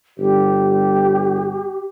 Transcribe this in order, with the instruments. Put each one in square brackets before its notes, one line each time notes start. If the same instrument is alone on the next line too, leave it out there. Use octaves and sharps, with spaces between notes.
[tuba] G1 [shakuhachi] G4